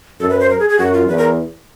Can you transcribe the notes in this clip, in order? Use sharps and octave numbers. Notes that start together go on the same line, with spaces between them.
F#2 A4
B4
C5
A#4
G#4
G#4
F#2 F#4
F4
E2 B4
A#4